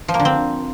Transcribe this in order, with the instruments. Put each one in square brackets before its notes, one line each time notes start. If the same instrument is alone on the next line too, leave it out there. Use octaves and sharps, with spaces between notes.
[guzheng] F3
A#3
D3
C4